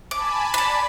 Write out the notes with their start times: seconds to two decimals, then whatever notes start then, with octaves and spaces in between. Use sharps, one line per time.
0.11 G#5 A5 B5 D6
0.54 D5 A5 B5